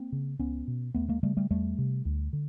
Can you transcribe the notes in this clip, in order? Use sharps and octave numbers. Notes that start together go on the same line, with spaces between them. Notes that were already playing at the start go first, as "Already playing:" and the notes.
Already playing: A#3 C4
C#3
C#2 B3 C#4
B2
D#2 A3 B3
G#3 A#3
C#3 G3 A3
G3 A3
E2 G3 A3
C3
D2
D3